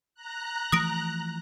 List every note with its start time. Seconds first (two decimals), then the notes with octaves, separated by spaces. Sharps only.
0.15 A#5 F#6
0.72 E3 F3 A3 D#6 A#6 D7